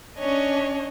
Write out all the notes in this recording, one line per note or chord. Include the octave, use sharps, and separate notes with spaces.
C#4 D4 C#5 D#5